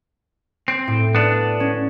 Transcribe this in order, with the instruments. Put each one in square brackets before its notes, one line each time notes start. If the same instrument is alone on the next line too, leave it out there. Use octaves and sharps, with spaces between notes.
[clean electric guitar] C4
[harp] A2
[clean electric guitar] B3 D4
[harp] C#4